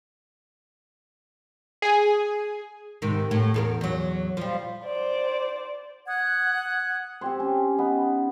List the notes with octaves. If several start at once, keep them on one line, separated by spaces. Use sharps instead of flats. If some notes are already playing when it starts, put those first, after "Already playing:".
G#4 G#5
G#2 C3 D#3
A2
E2 A4 A#4
E2 F#3
F3 G3
C5 D5
F#5 D#6 F#6 G#6
C4 G4 C5
C#4
B3 D#4